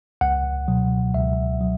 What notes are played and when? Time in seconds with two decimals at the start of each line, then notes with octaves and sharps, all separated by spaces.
0.21 C#2 F#5
0.68 B2 F#3
1.14 C#2 E5
1.61 F#3